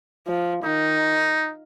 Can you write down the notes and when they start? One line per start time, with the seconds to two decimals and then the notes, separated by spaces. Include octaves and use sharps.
0.27 F3
0.64 D#3 D#4